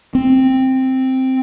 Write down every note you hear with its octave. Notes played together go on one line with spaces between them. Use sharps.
C4